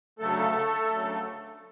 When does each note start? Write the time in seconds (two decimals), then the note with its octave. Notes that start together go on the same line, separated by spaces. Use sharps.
0.19 D2 C#3 F#3 A3 A4
0.91 D2 C#3 F#3